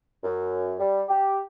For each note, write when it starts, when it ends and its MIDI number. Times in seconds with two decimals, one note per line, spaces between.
0.23 0.73 42
0.79 1.02 55
1.09 1.40 67